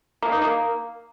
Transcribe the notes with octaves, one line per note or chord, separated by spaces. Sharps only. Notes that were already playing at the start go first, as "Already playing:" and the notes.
A#3
D#4
A#3